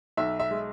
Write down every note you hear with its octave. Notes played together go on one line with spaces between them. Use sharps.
B1 E5
E5
G#3